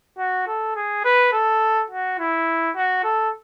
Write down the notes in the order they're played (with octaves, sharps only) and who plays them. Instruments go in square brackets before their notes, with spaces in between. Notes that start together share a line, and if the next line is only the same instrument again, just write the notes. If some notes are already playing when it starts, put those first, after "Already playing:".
[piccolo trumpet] F#4
A4
G#4
B4
A4
F#4
E4
F#4
A4